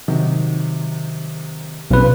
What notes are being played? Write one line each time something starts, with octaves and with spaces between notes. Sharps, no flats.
C3 D#3 F#3
B1 A#2 C#3 C4 B4